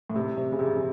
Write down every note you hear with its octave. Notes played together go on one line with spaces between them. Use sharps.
A2
C3
C3
C#3
C3
C#3